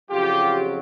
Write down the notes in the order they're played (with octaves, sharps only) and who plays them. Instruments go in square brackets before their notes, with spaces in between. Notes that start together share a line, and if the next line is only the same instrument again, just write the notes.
[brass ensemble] F2 C#3 F#3 F4 G4